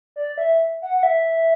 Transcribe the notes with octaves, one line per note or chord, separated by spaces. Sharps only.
D5
E5
F#5
F#5
E5